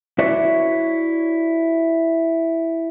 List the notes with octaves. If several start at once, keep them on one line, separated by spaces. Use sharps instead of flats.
E4 F#4 B4 C#5 D5 E5